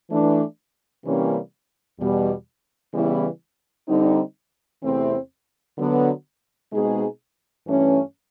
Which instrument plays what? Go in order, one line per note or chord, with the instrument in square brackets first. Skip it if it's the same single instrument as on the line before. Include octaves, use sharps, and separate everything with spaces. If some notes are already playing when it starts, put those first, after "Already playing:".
[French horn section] E3 A3 D4
C3 E3 G3 A#3 C#4
E2 B2 G3
C#3 E3 G3 B3 E4
D3 G3 C4 D#4
E2 C3 E3 A3 C4
D3 F#3 B3
B2 G#3 C4 D#4 G#4
G2 E3 A3 C#4